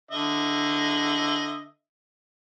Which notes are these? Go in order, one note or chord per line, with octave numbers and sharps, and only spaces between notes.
D3 D#5 E5